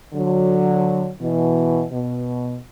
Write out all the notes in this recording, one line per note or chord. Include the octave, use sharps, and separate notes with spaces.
D3 F#3
B2 E3
B2